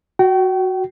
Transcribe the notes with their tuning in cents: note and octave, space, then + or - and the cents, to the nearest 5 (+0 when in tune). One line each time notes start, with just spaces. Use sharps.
F#4 +0 G5 -35